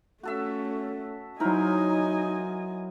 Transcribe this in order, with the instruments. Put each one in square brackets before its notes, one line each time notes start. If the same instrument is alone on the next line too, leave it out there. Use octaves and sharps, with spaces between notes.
[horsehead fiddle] A3 C#4 [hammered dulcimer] F#4 A4 E5
[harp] F#3 E4 [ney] D#4 [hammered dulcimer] A#4 C5 C6 [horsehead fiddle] D#5 G#5